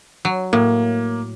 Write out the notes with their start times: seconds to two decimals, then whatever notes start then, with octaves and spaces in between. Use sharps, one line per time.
0.25 F#3
0.53 A2 A#3